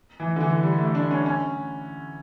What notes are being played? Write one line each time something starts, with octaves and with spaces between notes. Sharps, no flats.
E3
D3
E3
G3
A3
D4
C#4
C#4